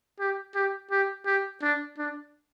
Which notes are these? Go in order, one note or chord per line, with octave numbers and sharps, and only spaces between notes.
G4
G4
G4
G4
D4
D4